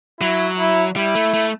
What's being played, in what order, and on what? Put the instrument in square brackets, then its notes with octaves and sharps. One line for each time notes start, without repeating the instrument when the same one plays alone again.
[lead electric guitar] F#3 [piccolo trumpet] E4
[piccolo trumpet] E4
[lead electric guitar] G3 [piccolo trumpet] E4
[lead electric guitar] A3
A3